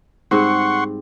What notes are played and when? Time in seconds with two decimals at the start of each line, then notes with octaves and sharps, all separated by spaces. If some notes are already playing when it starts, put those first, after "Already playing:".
0.31 G#2 G3 C4 F#5 C6 C#6